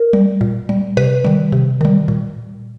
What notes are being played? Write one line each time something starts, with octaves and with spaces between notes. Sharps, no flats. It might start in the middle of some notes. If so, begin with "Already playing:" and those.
Already playing: A#4
G3
A#2
G3
C3 B4
D#3 G3
C3
D#3 G3
A#2